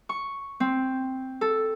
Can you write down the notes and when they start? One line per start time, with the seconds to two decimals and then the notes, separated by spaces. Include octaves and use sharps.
0.09 C#6
0.60 C4
1.41 A4